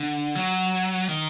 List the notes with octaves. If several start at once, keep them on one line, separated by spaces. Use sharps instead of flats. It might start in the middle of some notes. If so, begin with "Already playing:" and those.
Already playing: D3
F#3
D#3